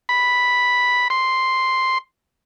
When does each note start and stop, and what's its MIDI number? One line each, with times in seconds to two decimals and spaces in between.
0.09 1.08 83
1.10 1.98 84